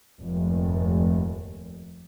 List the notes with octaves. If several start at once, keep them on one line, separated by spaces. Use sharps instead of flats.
F1 D#2 G#2